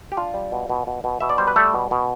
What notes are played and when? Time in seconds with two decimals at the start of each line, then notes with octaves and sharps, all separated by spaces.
0.12 G4
0.17 D4 F4
0.34 G3
0.52 B2
0.69 B2
0.87 B2
1.04 B2
1.20 B2 E5
1.30 D5
1.38 G3 C5
1.47 B4
1.56 G3 A3 A4
1.74 B2
1.91 B2